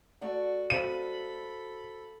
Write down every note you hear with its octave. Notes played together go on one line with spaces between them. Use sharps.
A3 F#4 D5 F#5
F#4 A4 C5 F5 B5 D#7